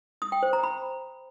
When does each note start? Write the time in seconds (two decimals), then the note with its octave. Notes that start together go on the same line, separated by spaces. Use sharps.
0.22 D#6
0.32 G5
0.43 C5
0.53 A#5
0.63 B5